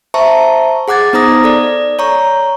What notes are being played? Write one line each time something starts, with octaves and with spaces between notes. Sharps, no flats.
C5 E5 A5 A#5 C#6
G#4 F#5 D6 F#6 G#6 A6
B3 D#4 C5 A#5 D#6 A#6
A4 D5
C#5 A#5 C#6